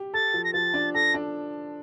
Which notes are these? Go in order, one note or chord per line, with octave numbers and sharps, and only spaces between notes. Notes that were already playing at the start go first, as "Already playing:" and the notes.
Already playing: G4
A4 A6
F3
A#6
F3 A6
D4
A4 A#6
D4